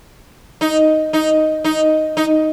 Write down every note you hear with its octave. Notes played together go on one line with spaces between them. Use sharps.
D#4
D#4
D#4
D#4